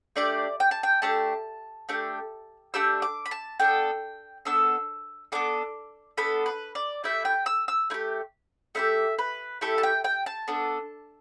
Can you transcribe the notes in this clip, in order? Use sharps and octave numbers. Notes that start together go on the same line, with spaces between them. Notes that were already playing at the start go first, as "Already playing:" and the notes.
A3 D4 G4 D5
G5
A5
G5
A3 D4 G4 A5
A3 D4 G4
A3 D4 G4 E6
D6
B5
A5
B3 D4 A4 G5
B3 D4 A4 E6
B3 D4 A4 D6
B3 D4 A4 B5
B4
D5
A3 E4 G4 E5
G5
E6
E6
A3 E4 G4
A3 E4 G4 E5
B4
A3 E4 G4 A4
A5
G5
G5
A5
B3 D4 A4